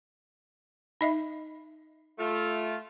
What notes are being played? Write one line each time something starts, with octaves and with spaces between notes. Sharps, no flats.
D#4 D#5 E5
A3 F4